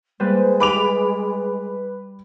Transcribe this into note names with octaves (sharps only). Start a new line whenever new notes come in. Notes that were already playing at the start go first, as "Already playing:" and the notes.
G3 G#3 A#3 B4 C5
B4 B5 D6 F7